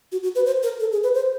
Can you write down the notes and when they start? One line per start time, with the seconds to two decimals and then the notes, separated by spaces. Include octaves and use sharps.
0.12 F#4
0.23 F#4
0.35 B4
0.46 C5
0.63 A#4
0.80 A4
0.92 G#4
1.03 B4
1.14 C5